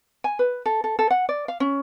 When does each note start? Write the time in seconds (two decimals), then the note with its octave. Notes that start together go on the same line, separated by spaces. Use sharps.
0.24 G#5
0.39 B4
0.66 A4
0.84 A4
0.99 A4
1.10 F#5
1.29 D5
1.48 F5
1.60 C#4